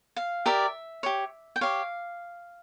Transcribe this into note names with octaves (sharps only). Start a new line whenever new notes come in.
F5
G4 A#4 D5 E5
G4 C#5
G5
G4 C#5 F5